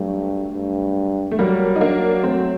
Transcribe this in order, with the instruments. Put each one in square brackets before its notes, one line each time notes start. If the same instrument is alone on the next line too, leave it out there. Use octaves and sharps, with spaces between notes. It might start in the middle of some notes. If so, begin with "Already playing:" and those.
Already playing: [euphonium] G2 [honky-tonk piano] F#3 A3
[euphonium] G2
[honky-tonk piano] A3
[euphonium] F#3 [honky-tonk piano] G3 A#3
[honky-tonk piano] D#4
A#3 D4
A3 C4